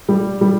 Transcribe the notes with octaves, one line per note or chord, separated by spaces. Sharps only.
G3
G3